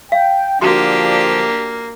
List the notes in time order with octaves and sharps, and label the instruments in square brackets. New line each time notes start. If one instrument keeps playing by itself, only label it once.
[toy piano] F5 [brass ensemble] G5
[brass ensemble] D3 F3 [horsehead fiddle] A#3 [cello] D4 G4 [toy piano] F#4 C6